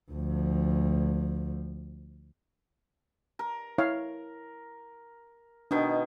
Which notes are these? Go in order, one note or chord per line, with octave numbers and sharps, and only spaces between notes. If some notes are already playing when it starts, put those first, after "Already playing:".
D2 F3
A#4
E4 C#5 F5
B2 D#3 D4